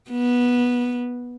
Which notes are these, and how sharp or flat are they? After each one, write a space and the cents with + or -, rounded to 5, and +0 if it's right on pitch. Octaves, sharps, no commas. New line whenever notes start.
B3 -15